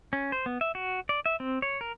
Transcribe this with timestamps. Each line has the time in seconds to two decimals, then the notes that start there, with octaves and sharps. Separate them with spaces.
0.13 C#4
0.32 C5
0.46 B3
0.61 E5
0.75 F#4
1.09 D5
1.26 E5
1.40 C4
1.62 C#5
1.81 A#4